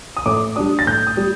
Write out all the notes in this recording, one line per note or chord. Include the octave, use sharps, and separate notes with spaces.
D#6
A2 D6
G3 D4 D#6
A6
A2 G6
D#6
G3